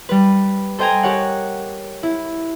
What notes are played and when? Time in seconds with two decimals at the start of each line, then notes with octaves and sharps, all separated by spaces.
0.09 G3 B4
0.78 A4 C5 D#5 G5 G#5 A#5
1.03 G4 A#4 C#5 F#5
2.03 E4